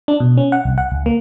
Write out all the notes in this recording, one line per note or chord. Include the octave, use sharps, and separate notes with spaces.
D4
B2
C#4
F#5
C2
F#5
C#2
A#3